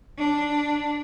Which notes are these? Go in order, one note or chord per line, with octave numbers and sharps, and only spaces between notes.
D4